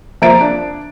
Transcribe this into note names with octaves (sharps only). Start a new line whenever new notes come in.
F3 A#3 E5 A#5 A6 D7
D4